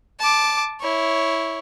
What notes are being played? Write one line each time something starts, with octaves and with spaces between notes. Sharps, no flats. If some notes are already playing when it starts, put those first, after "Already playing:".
A5 D6
E4 C#5